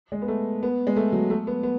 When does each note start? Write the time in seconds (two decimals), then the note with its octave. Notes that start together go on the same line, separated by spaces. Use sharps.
0.12 G#3
0.22 B3
0.28 A3
0.63 B3
0.87 G#3
0.96 A3
1.12 F#3
1.30 A3
1.47 B3
1.63 B3